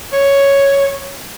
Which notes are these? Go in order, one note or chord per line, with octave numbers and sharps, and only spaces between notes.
C#5